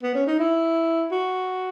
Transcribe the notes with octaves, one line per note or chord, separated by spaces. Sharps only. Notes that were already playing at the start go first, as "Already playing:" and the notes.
B3
C#4
D#4
E4
F#4